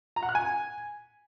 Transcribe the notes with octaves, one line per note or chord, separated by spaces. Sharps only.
A#5
F#5
F#6
G#5